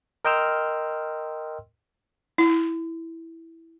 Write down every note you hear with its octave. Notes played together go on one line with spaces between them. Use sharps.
A#4 D#5 G5 C6 E6 F6
E4